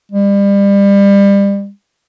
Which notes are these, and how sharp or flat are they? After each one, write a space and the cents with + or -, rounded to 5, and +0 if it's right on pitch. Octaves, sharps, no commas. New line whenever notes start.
G3 +30